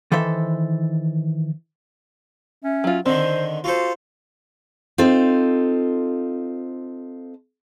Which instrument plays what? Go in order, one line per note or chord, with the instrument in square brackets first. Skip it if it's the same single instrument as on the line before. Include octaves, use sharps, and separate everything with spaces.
[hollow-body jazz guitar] D#3 E3 A4 C5 E5
[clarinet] C#4 [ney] E5
[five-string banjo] F#3 F4
[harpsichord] D3 D#3 [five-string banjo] C4 [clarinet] C5 [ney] D#5
[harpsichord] F4 A4 C5 [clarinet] F#4 [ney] F5
[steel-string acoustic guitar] C4 D#4 F4 A4 C5